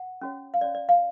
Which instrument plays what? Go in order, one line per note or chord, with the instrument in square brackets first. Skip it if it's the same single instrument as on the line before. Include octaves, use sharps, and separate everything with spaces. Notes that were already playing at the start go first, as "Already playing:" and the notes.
Already playing: [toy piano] F#5
C#4 F#4 C#5
F5
C#4 F#4 C#5 D5
D5
F5